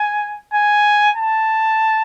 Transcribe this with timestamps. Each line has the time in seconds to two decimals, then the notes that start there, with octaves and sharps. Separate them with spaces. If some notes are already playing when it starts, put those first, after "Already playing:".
Already playing: G#5
0.54 G#5
1.16 A5